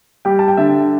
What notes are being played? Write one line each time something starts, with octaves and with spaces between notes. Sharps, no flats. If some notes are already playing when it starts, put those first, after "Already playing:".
G3 G4 G5
A5
G5
D3 E5